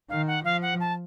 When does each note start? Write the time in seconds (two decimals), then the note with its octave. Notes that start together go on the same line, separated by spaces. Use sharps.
0.10 D#3 F5
0.27 F#5
0.45 F3 F5
0.62 F#5
0.80 A5